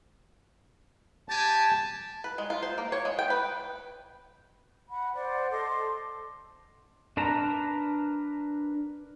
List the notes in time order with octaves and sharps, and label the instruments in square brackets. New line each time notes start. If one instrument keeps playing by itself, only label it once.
[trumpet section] G4 G#5 [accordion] A5
[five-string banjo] B4
G#3
F4
C5
A#3
C#5
G#3
G5
B4
[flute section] F#5 B5
C5 D5 F#5
A4 D#5 C6 D6
[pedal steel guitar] D4 A#4 B4 A5 A#5